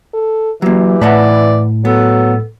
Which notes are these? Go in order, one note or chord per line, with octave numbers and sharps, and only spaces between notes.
A4
E3 F#3 A#3 G4
A2 B4 D5 E5 F#5
F#3 B3 A4